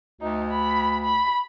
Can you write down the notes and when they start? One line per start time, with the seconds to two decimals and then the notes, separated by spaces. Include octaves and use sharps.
0.21 D2 D#4
0.51 B5
1.04 B5